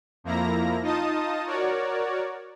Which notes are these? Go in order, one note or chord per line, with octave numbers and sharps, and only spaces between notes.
F2 F3 A#3 E4 A#5 A#6
D#4 F4 D#5 A5 D#6
F#4 A#4 C#5 D5